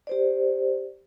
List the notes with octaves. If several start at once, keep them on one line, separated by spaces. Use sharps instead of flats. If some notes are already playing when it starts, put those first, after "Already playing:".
G4 C5 D5